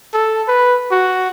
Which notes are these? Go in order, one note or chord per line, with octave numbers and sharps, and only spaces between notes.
A4
B4
F#4